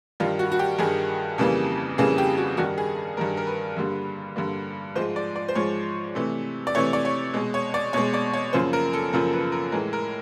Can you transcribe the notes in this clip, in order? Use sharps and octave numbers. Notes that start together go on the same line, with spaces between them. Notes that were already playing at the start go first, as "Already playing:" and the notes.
G2 D#3 G3 F4
F#4
F#4
G4
G2 D#3 G3 G#4
F2 C#3 E3 G3 A#3
F2 C#3 E3 G3 A#3 G#4
G4
F#4
G2 D#3 G3 F#4
G#4
G2 D#3 G3 A#4
A#4
B4
G2 D3 G3 A#3
G2 D3 G3 A#3
G#2 F3 G#3 C5
D5
D5
C5
G#2 F3 G#3 C#5
C3 E3 A3
D5
C3 E3 A3 C#5
D5
C#5
B2 G#3
C#5
D5
B2 G#3 C#5
D5
C#5
F#2 C#3 F3 A#3 C5
A#4
A4
F#2 C#3 F3 A#3 A#4
B4
A#4
A2 E3 G#3 A#4
A#4